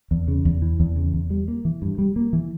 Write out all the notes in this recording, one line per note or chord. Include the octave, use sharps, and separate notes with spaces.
E2
C#3
E2
E3
E2
C#3
E2
G3
A#3
E3
G2
G3
A#3
E3